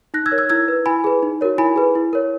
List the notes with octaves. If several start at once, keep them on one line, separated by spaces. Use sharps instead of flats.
D#4 F#6 A#6
E6 G#6
A#4 C#5
E6 G#6
E4 E6 G#6
B4
E4 G#5 B5
G#4 B4
D#4
F#4 A#4 C#5
E4 G#5 B5
G#4 B4
E4
A#4 C#5